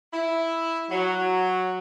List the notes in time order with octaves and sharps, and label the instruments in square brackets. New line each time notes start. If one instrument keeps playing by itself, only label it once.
[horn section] E4
F#3